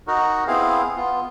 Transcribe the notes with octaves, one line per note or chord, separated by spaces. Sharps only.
D#4 F#4 A#4
B3 C4 E4 G#4 F5
B3 F4